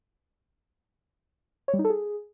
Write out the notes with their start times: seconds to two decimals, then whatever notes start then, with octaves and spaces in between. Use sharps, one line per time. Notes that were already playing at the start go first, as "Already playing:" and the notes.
1.68 C#5
1.74 G3
1.79 D#4
1.85 A4
1.90 G#4